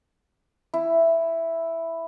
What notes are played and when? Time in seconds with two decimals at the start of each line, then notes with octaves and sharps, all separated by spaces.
0.74 E4